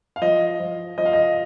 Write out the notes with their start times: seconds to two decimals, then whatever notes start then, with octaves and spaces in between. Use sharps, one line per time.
0.16 F5
0.22 F3 D#5
0.59 F3
0.98 F3 D#5
1.05 F5
1.13 D#5